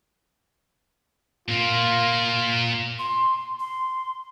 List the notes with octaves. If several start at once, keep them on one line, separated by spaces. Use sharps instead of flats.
A#2 A#3 F4
C6
C6